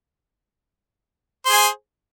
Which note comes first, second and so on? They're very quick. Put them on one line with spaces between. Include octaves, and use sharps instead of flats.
C5 G#4 G#5